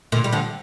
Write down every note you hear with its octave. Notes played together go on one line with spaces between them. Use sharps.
A#2 D3
G3
D3 F3